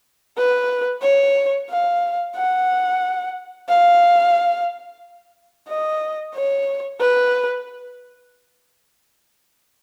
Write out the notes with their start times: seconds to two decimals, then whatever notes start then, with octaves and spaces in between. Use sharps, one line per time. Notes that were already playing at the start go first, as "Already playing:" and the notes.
0.37 B4
1.03 C#5
1.70 F5
2.36 F#5
3.69 F5
5.68 D#5
6.35 C#5
7.00 B4